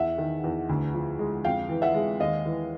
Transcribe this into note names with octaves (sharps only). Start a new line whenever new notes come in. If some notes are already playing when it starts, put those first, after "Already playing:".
Already playing: E2 E5 F#5
D#3
E2
D2
F3
G#3
F2 F5 G5
E3
E5 F#5
G#3
D#2 D#5 F5
E3